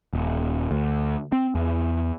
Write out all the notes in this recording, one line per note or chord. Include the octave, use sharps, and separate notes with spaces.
D#1
D2
C4
E2